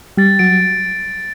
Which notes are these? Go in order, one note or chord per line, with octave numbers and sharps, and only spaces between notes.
G3 A6
F#3 D7